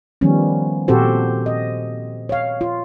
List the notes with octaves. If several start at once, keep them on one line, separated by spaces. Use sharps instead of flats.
D#3 F3 G3 B3 C#4
A#2 C4 F#4 G4 A4 C5
D#5
C#5 F5
F4